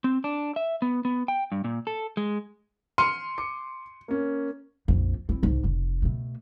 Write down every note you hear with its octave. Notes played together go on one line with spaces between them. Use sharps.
C4
D4
E5
B3
B3
G5
G2
A#2
A4
G#3
C6 F6 C#7 D#7
D6 C#7
A#3 C#4
A#1 F2
C4 E4
C2 G#2
F1
B2 A3